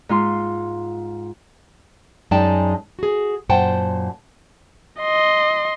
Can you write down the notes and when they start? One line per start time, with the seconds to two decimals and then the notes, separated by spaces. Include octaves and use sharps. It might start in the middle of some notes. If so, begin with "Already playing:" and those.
0.09 G#2 F4 C6
2.31 F#2 G#3 D#4 D5 G5 A5
2.99 F#4 G#4
3.49 F#2 A#2 C5 F#5 G5 A5
5.01 D#5 C6